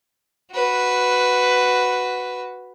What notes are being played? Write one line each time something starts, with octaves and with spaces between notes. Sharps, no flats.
F#4 B4